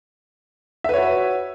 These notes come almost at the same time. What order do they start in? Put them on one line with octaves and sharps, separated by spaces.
E5 B4 C#5 F#4